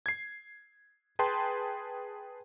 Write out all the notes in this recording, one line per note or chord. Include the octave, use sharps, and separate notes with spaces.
G#6 C7
G#4 B4 G5 A5 C6